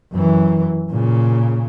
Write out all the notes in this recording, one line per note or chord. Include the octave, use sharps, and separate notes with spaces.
F#2 E3
A#2 C#3